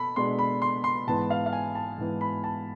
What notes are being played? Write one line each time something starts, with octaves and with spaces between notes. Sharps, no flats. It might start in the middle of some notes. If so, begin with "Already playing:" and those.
Already playing: B2 A4 B5
B2 G#3 D4 C6
B5
C6
C6
G#2 E3 B3 A5
F5
F5
G#5
A5
G#2 E3 B3
B5
A5